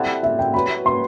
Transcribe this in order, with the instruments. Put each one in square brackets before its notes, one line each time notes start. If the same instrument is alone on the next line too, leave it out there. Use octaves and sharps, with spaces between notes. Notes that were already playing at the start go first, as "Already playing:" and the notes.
Already playing: [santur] G3 C4 E4 A4 [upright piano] F#5
[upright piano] E5
G5
[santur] F#3 B3 F#4 B4 [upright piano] B5
[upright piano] C6